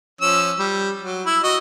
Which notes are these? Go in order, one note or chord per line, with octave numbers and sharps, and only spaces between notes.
F3 C#4 E6
G3
F#3
E4
F#4 D#5